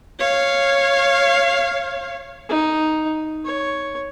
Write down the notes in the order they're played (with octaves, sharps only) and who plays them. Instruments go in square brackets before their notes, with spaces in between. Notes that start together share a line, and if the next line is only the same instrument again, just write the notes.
[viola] C#5 F5
[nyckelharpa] D#4
C#5